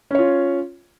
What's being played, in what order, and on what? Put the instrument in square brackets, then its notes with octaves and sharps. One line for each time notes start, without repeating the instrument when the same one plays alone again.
[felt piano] C#4
C#5
F4